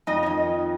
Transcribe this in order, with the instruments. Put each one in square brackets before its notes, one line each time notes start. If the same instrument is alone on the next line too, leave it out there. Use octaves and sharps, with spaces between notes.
[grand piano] F2 [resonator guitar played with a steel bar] D#4 D#5
[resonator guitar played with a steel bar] C#5
[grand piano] D#3 [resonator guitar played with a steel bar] D#5